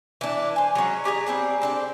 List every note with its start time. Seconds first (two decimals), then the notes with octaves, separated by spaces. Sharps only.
0.21 E3 D4
0.56 C5 G#5
0.75 F#3 G#3 C#4
1.04 D4 G4 G#4 A#5
1.26 G3 C4 D4 G#4
1.62 C4 D4 A4